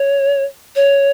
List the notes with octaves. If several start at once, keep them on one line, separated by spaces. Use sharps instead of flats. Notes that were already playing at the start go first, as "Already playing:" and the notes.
Already playing: C#5
C#5